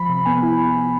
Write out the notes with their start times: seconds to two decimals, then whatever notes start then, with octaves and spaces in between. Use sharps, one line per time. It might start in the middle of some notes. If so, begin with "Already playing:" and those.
Already playing: F3 B5
0.09 C3
0.25 B3 G#5
0.43 E4